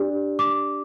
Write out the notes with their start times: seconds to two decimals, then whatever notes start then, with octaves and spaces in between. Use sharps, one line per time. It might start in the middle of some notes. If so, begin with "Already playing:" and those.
Already playing: D4 G4 D5
0.39 D6